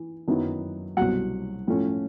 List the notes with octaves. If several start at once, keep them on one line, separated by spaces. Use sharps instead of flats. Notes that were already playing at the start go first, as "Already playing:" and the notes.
Already playing: E3
F#2 D#3 F#3 B3 E4
C2 B2 F#3 F#5
A2 F3 A3 C#4